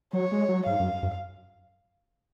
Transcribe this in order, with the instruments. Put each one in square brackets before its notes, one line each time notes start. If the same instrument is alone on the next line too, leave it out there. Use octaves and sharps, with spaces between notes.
[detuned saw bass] F#3 [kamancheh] C#5
[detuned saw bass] G#3
F#3
[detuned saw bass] G#2 [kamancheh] F5
[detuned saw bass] F#2
F#2